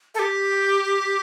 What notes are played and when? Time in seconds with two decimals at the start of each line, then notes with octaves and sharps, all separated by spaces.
0.14 A4
0.19 G4